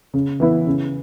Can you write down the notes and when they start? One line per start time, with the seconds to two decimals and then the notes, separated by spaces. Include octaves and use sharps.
0.14 C#3
0.40 E3 B3 E4
0.67 C#3